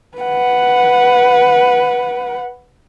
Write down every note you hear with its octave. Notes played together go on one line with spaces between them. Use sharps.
B4 F#5